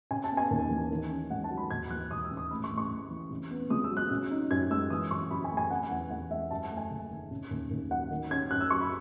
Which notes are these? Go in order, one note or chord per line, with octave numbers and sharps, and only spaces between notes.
C#3 G#5
A5
B3
G#5
D#2
E3
D#3
C#4
G#2 F#5
A5
F#3
B5
D#2 G#6
E3 F#6
E1 D#6
E6
C#3
D#6
A2 B5
C#6
A1
C#6
A1
E3
C#3
B3
C#2 D#6
E6
F#3
F#6
C#3
D#4
F#2 G#6
G#3 E6
E3 D#6
F#2 C#6
F#2 B5
G#5
A3
G#5
C#3 F#5
E2 F#5
E2 F#5
G#3 E5
F#2 A5
A5
A3
G#5
F#1
D#3
C#3
D#2
D#2
F#3 F#5
D#3
C#4 G#6
F#2 F#6
E6
F#3 C#6
B5